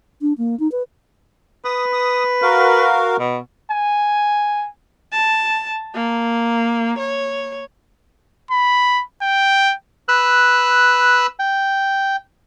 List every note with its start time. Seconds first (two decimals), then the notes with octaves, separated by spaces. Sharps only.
0.21 D4
0.38 A#3
0.59 D#4
0.72 B4
1.65 B4 D#6
1.93 D#6
2.42 F#4 A#4 F5
3.19 B2
3.70 G#5
5.12 A5
5.94 A#3
6.98 C#5
8.51 B5
9.22 G5
10.08 B4 E6 F#6
11.39 G5